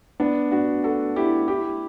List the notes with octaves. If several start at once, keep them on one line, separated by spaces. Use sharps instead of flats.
B3 D4
D4 F#4
F#4 A4
E4 G4
E4 G4